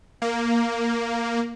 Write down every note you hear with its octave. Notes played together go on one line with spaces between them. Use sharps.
A#3